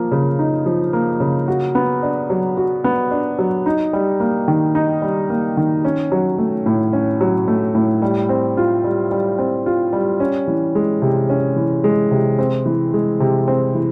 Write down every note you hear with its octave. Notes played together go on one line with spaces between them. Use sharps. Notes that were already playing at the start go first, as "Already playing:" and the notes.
Already playing: F3 A#3
C#3
D#4
F3
A#3
C#3
F#4
B3
D4
F#3
F#4
B3
D4
F#3
D#4
G3
A#3
D#3
D#4
G3
A#3
D#3
C#4
F#3
A3
A2
C#4
F#3
A3
A2
G3
C4
F4
G3
G3
C4
F4
G3
C#4
E3
G#3
C3
C#4
E3
G#3
C3
C4
E3
G#3
C3
C4
E3